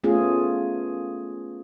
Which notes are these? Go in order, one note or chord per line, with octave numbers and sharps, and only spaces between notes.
A3 B3 C#4 F4 G#4